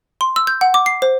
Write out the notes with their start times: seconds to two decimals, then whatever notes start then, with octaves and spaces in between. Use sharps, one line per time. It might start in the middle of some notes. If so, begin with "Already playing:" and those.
0.21 C6
0.36 E6
0.47 G6
0.61 F#5
0.74 D6
0.86 C7
1.02 C5